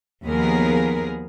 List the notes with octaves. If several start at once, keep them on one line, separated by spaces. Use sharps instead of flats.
D#2 F3 B3 G#4 A#4